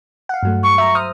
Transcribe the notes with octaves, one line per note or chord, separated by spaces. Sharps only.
F5 F#5
G2 F#3 A3
C#6
E5 A#5
C5 D#6 F6